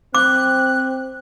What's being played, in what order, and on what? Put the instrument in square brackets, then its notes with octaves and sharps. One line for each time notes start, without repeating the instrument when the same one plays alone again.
[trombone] C4 [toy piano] D6 [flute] F#6